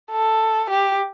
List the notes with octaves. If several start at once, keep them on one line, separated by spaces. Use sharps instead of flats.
A4
G4